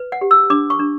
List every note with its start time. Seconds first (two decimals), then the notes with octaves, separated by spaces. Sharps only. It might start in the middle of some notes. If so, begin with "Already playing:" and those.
Already playing: B4
0.12 F#5
0.21 G4
0.31 E6
0.50 D4 D6
0.70 C#6
0.79 D4